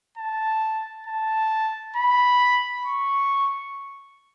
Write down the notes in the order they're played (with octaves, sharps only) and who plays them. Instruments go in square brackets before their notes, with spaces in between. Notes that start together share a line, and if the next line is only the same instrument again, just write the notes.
[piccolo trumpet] A5
A5
B5
C#6